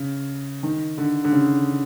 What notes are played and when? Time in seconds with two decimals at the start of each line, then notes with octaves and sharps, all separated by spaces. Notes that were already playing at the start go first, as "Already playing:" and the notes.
Already playing: C#3
0.63 D#3
0.98 D3
1.24 D3
1.32 C#3